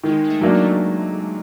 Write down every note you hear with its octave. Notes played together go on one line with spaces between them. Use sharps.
D#3 G#3
G#3
A3
F#3 A#3 D4
A3